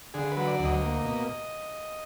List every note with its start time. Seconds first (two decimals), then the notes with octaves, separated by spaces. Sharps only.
0.14 D3 G#4
0.32 F#3 B4
0.48 D5
0.59 D2
0.65 D#5
0.82 A#3
1.05 B2